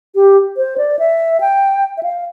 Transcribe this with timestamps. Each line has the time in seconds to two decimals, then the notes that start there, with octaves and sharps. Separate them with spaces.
0.15 G4
0.57 C5
0.78 D5
0.99 E5
1.40 G5
1.97 E5
2.03 F5